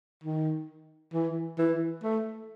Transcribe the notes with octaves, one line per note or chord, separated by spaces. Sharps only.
D#3
E3
E3
A3